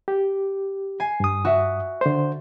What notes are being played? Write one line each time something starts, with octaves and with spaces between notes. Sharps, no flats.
G4
G#5 C7
G2 D#6
F#4 E5
D3 C5